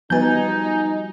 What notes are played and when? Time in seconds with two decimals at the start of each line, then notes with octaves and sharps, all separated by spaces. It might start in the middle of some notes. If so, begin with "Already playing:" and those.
0.10 F3 G3 B3 D#4 F#4 B4 G#5 G6